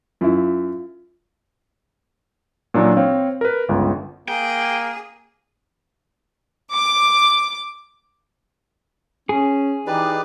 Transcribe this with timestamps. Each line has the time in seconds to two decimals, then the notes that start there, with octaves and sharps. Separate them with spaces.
0.21 F#2 E4 F4
2.74 A#2 E3 F#3 D4 D#4
2.97 C4 C#5 F5
3.41 A#4 B4
3.69 G1 C#2
4.28 A#3 G#4 G5
6.73 D6
9.29 C#4 G#4
9.87 E3 D#4 G4 B4 D5